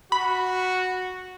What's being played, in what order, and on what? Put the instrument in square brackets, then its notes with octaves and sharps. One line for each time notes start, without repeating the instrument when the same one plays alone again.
[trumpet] F#4 [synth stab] B5